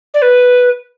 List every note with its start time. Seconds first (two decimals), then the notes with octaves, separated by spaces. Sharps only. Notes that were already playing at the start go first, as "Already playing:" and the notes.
0.14 D5
0.22 B4